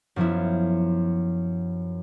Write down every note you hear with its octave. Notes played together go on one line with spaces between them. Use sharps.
F#2 F3 B3 E4